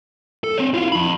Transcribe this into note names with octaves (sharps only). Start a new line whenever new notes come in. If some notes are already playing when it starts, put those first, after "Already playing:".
A4
C4 C#5
E4 F4
F2 B5